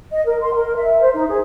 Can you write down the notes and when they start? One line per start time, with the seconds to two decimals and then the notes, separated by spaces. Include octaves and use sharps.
0.11 D#5
0.26 A#4
0.41 C6
0.54 A#4
0.76 E5
1.01 C5
1.14 D#4
1.29 G#4